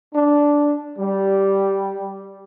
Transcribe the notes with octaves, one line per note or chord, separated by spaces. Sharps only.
D4
G3